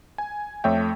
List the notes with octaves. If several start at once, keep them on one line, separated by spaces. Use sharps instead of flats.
G#5
F2 A3 C#5 E5 G5